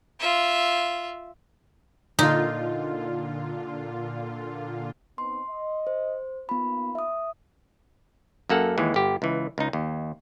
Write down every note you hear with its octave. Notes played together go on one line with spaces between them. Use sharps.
F4 E5
A#2 D3 D#4 F4
B3 C4 D#4 C6
D#5
C5
A#3 B3 D#4 F4 B5
E5 D#6
F#2 A#3 A4 F#5
D#2 E3 G#3
G1 G4
C#2 E3
C#2 D#4
D#2